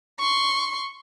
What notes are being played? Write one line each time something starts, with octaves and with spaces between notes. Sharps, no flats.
C6 C#6